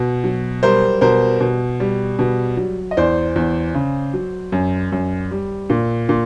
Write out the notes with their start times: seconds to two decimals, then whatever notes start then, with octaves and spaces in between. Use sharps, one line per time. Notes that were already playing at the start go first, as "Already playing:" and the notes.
Already playing: B2
0.24 F#3
0.63 G3 A#4 C5
1.01 B2 A#4 C5
1.40 B2
1.80 G3
2.19 B2
2.57 F#3
2.91 D#5
2.97 E2 C5 D5
3.36 E2
3.74 C#3
4.14 F#3
4.52 F#2
4.92 F#2
5.31 G3
5.70 A#2
6.09 A#2